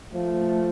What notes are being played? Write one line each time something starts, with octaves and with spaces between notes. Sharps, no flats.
F3 A3